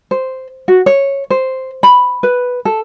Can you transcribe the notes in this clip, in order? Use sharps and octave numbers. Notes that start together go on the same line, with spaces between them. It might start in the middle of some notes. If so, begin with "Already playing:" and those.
C5
F#4
C#5
C5
B5
B4
A4